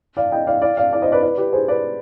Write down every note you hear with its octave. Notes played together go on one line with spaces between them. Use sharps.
D5 F5
D#5 G5
D5 F5
D5 F5
D5 F5
D5 F5
C5 D#5
B4 D5
B4 D5
G4 B4
G#4 C5
B4 D5